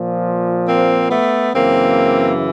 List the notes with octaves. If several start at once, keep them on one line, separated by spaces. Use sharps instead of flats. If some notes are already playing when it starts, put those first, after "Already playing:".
Already playing: A#2 F3
A#3 C4
A3 B3
F#2 C#3 E3 A#3 C4